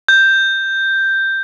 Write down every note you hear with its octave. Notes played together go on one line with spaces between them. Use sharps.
G6